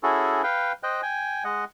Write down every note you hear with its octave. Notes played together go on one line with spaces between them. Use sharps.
C#4 E4 F#4 G#4 A4
B4 F5 G5
C5 D#5 G5 F#6
G5 G#5
G#3 D#5 F#5